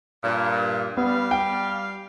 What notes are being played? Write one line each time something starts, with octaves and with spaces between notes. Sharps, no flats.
G2 A#2
G3 B3 F5
G5